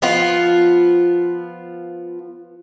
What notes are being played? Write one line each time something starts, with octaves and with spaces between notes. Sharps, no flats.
F3 B3 F4